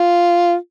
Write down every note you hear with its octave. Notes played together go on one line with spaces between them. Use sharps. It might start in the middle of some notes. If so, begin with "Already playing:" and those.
Already playing: F4